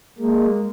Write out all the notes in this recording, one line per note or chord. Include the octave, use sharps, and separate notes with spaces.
G#3 A#3